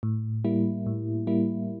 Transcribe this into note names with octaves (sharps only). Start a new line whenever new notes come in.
A2
G3 A#3 E4
A2
G3 A#3 E4